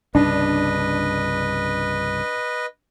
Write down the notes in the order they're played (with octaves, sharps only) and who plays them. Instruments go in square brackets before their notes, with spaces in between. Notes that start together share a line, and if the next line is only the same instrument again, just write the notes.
[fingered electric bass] C2 G2 C#3 [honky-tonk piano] D4 [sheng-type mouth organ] B4 D#5